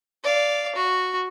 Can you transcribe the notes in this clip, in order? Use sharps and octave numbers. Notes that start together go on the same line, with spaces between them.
D5 F5
F#4